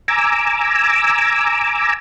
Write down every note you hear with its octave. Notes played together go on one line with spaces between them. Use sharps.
G#5 A#5 D6 E6